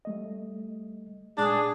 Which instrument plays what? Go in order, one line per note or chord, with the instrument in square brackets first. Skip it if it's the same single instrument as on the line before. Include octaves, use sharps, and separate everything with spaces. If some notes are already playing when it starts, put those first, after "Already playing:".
[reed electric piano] G3 A3 D#5
[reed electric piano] A#2 G#3 F#6 [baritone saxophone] D4 [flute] G#4